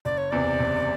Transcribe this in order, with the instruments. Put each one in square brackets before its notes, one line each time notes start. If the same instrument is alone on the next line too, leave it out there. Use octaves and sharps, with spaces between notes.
[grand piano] F#1 [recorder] D5
[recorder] C#5
[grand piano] E2 C3 [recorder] D5
[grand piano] F#1